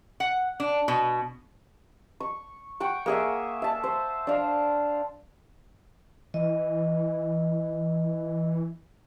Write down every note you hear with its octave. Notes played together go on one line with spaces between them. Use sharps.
F#5
D4
B2
C#6
F#5 G5 C#6
A#3 G#4 E5
E5 A5
C5
D4 F5
E3 D#5